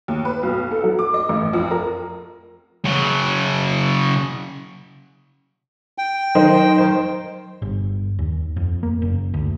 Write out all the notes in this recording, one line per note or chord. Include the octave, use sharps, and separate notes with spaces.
D#2
B4
B1
A4
F#3
D6
D#5
A1
F2
A#4
C#3 F#3
G5
D#3 F#3 D#4 C5
D#3 C5
G1
D#2
F2
A#3
F#1
D2